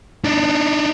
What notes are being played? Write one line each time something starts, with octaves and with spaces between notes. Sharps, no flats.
D4 D#4